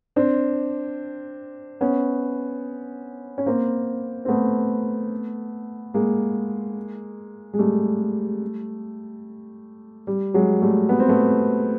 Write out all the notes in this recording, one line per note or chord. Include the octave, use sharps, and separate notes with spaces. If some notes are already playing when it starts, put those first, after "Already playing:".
C4 D4
B3 C#4
C#4
A#3 C4
C4
A3 B3
G#3 A#3
G#3
G3 A3
G3
F#3 G#3
G3 A3
B3
C4
A3 B3